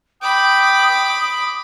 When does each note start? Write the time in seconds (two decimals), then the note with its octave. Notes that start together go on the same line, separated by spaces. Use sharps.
0.22 G5 B5 D6 D#6